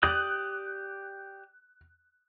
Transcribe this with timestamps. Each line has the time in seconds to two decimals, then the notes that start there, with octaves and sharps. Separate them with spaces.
0.03 G4 D5 D#6 F#6